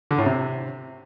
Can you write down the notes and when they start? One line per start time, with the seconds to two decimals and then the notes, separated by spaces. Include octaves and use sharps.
0.11 D3
0.18 A2
0.26 C3